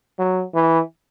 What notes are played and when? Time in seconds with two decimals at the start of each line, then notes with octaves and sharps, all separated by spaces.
0.19 F#3
0.54 E3